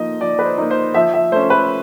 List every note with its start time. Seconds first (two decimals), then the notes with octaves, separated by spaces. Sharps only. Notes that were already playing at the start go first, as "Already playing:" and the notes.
Already playing: F3 A#3 D#4 D#5
0.21 F3 D5
0.39 B4
0.45 C5
0.58 A#3 D#4
0.71 C5
0.94 F3 E5
1.14 E5
1.32 A3 C#4 C5
1.50 B4